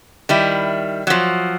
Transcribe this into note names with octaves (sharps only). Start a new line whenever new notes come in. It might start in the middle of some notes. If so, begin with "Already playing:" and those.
D#3 G3 E4
F3 F#3